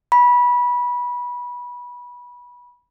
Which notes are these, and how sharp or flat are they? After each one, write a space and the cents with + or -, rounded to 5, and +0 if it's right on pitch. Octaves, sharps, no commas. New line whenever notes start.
B5 -20